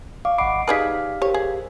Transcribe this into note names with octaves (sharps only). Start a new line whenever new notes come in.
D5 F5 C#6 D6
G#1 D#5 F#5 B5 D6 C7 D7
D#4 G4 G#4 B4 D5 F5 F6 B6
G4 A#4 C5 C#5
G#4